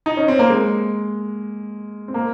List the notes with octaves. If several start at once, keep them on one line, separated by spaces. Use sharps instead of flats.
D#4
C#4
C4
A#3
G#3
C4
A#3